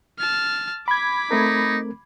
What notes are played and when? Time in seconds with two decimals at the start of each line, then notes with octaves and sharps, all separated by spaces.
0.19 A5 F6
0.88 B5 D6 G#6 B6
1.31 A3 C4 D#4 A#4